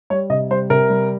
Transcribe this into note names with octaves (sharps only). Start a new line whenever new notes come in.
G3 C#5
C3 D#5
G3 C5
C3 A#4
G3